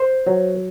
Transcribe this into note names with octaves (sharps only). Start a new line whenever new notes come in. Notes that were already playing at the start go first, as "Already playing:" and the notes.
Already playing: C5
F#3